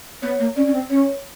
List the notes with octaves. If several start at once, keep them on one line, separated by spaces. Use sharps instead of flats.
B3 C#5
A#3
C#4 D5
C#4
C4
C#4 C#5